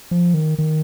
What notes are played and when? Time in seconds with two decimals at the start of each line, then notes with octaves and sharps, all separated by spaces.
0.11 F3
0.34 D#3
0.59 D#3